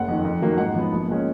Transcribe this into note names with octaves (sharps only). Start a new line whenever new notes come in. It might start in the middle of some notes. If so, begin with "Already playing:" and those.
Already playing: F#1 F#5
F2 D#3
F2
D#3 F#3 A#3
G#2 F#5
F3 B3
A#1
A#2 G#3 C#4